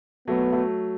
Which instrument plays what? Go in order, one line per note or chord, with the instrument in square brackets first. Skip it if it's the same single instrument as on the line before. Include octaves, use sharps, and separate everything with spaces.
[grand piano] F#3 A3 [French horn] B3
[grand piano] F#3 A3